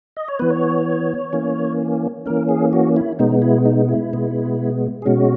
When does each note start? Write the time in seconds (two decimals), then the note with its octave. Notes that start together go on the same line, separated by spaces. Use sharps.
0.17 D#5
0.28 C#5
0.39 E3 B3 B4
0.51 C#5
1.33 E3 A#3 C#4
2.26 E3 A#3 C#4 A#4
2.49 G#4
2.73 F#4
2.96 E4
3.19 B2 G#3 B3 D#4
3.42 E4
3.65 D#4
3.89 E4
4.13 B2 G#3 B3
5.02 G#4
5.05 B2 G#3 C#4 F#4